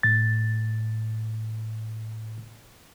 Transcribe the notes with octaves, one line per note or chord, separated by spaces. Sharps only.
A2 A6